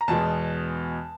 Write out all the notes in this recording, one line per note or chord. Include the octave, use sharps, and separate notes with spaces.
A#5
E2 B2 G#3 A5